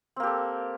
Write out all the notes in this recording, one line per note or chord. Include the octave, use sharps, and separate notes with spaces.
A#3 C4 G4 A4